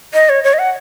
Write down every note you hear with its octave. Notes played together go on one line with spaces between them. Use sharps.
D#5
C#5
C#5
D#5
F#5